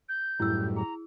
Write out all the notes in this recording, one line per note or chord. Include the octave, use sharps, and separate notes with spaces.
G6
F#2 A2 G3 E4 E6
G#4 A#5